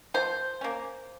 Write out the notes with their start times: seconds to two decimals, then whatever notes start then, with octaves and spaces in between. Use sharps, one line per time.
0.14 F3 C5
0.61 A#3 C#4